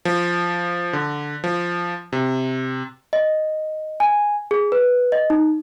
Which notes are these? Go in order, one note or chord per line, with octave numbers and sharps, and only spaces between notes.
F3
D3
F3
C3
D#5
G#5
G#4
B4
D#5
D#4